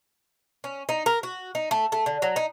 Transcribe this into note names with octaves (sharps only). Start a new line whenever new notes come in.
C#4
D#4
A#4
F#4
D#4
A3
A3
D3
F#3
D#4